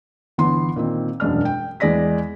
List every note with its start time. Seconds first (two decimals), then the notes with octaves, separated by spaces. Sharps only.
0.38 G1 E3 B3 C6
0.76 A#2 D#3 C4
1.20 E1 F#2 G#3 D4 F6
1.45 G5
1.80 E2 G#3 G#4 D5 A#6 B6